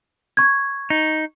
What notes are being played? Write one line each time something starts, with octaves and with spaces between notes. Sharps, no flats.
C#6 G#6
D#4